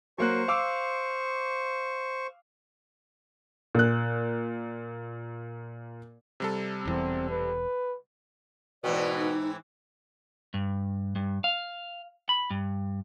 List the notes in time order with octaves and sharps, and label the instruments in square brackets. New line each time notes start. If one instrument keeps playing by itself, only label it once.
[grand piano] F#3 A#3 F#6 [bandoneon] C5 C#6
[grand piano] F5 D6 E6
[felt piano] A#2 F#6
[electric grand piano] C3 G3 A4
[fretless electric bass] E1 E2 [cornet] C4
[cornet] B4
[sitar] G#2 E3 C4 [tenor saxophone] B2 [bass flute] D5
[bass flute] D#4
[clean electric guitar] G2
G2
F5
B5
G2